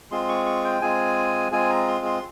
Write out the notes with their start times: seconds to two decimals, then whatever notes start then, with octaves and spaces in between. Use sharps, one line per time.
0.11 G#3 C4 F4 G#4 C6
0.29 C#6
0.46 C#6
0.64 G5
0.82 G#3 C4 F4 G#4 G#5
1.52 G#3 C4 F4 G#4 G#5
1.70 A#5
1.88 C6
2.06 C6